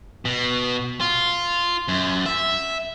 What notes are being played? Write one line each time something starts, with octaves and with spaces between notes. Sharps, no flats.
B2
F4
F#2
E5